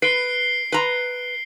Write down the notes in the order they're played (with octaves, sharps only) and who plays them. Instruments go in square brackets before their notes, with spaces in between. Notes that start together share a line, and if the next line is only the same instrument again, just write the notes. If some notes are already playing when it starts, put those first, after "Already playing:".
[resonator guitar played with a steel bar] B4 [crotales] C7 D7 G7
[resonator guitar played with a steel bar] B4 A#5